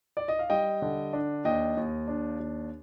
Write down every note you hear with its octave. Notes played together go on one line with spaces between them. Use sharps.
D5
D#5
F5
G3 D#5 G5
D3
D4
D#2 D#5 G5
D#2
D4
D#2